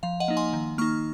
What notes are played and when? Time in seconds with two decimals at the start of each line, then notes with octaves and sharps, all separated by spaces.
0.03 F3 F5
0.20 D#5 F#5
0.28 A#3 D#4
0.37 G#5 C6
0.53 D#3
0.78 A#3 D#4 C#6 F6